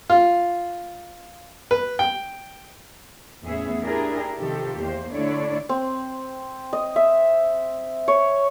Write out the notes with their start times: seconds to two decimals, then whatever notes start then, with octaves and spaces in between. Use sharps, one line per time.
0.10 F4
1.71 B4
1.99 G5
3.46 E2 A2 B3 C#4 G#4 E5
3.82 D4 E4 G4 G#4 A#4
4.38 C3 D#3 F3 G4 A4
4.81 E2 A#3 C5
5.11 D3 A3 D4 E4 C#5 D5
5.69 C4
6.73 D#5
6.96 E5
8.08 C#5